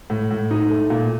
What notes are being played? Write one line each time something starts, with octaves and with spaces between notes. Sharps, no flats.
A2
A2
D#4
A3
A#2